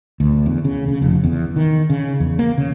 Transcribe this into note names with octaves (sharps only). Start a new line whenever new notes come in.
D2
E2
C#3
C#3
F1
E2
D#3
C#3
E2
A#3
C#3